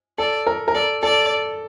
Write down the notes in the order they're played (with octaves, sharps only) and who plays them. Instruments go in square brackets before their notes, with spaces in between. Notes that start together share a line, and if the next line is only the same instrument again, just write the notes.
[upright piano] A4 [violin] D5
[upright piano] A#4
A#4
[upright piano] A4 [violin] D5
[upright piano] A4 [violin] D5